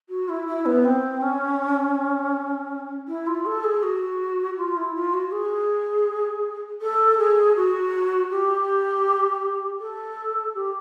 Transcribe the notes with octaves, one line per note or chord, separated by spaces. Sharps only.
F#4
E4
E4
B3
C4
C#4
E4
F4
A4
G#4
F#4
F4
E4
F4
F#4
G#4
A4
G#4
F#4
G4
A4
G4